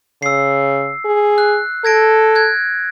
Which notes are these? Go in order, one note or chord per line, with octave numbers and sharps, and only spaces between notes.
C#3 E6 C7
G#4
F#6
A4 G#6 A#6 D7
F#6 G#6